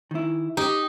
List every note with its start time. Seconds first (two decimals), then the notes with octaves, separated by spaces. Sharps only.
0.11 D#3 E4
0.57 D#4 G4